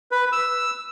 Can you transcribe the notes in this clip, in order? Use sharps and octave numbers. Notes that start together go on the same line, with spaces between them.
B4
E6